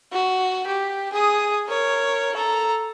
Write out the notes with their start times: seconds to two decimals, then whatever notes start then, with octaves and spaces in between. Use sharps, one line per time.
0.12 F#4
0.67 G4
1.12 G#4 D#6
1.67 A#4 C#5
2.35 A4 A#5